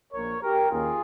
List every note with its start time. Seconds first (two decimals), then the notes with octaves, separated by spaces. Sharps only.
0.14 A#1 A#2 F3 A#4 C#5
0.42 G4 A#4
0.71 D#2 D#3 A#3 C#4 F4 G#4